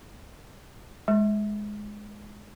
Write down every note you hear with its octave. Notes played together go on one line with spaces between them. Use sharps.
G#3